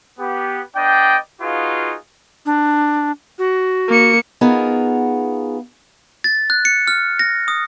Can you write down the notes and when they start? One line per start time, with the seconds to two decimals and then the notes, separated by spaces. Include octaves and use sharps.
0.19 B3 G4
0.76 B3 D4 D5 D#5 G5
1.41 D#4 F4 F#4 G#4 B4 F5
2.46 D4
3.39 F#4
3.88 A#3 C#7
4.41 B3 D#4 F4 F#4 G#4 A#4
6.24 A6
6.50 F#6
6.65 C#7
6.88 F6
7.19 A#6
7.48 D#6